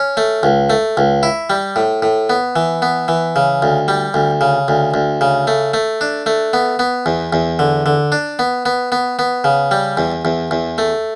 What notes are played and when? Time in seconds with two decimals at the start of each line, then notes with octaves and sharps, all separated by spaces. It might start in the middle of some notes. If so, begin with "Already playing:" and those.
Already playing: C#4
0.17 A3
0.43 C#2
0.70 A3
0.97 C#2
1.23 E4
1.50 G3
1.76 A2
2.02 A2
2.30 B3
2.56 E3
2.82 B3
3.08 E3
3.36 C#3
3.62 D2
3.88 G3
4.14 D2
4.41 C#3
4.68 D2
4.94 D2
5.21 C#3
5.47 A3
5.74 A3
6.01 D4
6.26 A3
6.53 B3
6.79 B3
7.06 E2
7.33 E2
7.59 D3
7.86 D3
8.12 D4
8.39 B3
8.66 B3
8.92 B3
9.19 B3
9.44 C#3
9.71 G3
9.97 E2
10.25 E2
10.51 E2
10.78 A3